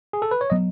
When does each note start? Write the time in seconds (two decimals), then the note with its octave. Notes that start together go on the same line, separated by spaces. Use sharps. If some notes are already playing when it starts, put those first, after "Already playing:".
0.13 G#4
0.22 A4
0.31 B4
0.41 C#5
0.50 F#3 B3 D#5